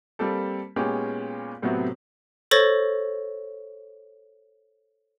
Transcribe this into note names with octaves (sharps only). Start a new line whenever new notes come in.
G3 A#3 C4 G4 A4
A#2 G#3 B3 C#4 G4
A2 C3 F#3 B3 C4 F#4
A4 C5 C#5 C#6 A6 A#6